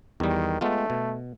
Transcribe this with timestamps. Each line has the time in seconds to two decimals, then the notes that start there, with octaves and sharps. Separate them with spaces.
0.20 E2 D#3 G3
0.61 G#3 A3 B3 F4
0.90 B2